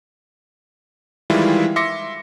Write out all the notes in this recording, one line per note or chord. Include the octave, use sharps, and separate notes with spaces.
D#3 E3 G3 G#3 E4 F4
E5 C6 D6 A#6 C#7